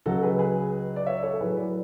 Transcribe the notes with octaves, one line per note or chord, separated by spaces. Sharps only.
C#2 C#3 F#3 F#4 A4
G#4 B4
G#4 B4
D5
C#5 E5
A4 C#5
A4
A2 F#3 G#4 B4
B4 D5